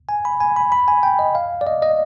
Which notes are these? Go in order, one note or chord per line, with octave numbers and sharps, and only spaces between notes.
G#5
B5
G#5
B5
B5
G#5
G5
D#5
F5
D5
D#5
D#5